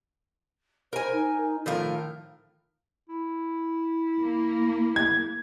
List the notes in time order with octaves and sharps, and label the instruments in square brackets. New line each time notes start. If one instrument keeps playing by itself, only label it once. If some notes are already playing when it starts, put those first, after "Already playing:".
[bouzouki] A#4 G#5 [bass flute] C5
[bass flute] D#4
[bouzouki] A2 F3 A#4 [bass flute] D#3
[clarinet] E4
[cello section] A#3
[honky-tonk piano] G#6